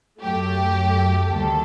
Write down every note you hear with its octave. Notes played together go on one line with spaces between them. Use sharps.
F#2 F#3 A3 G4
D2 C3 D#3 G3 A#3 A4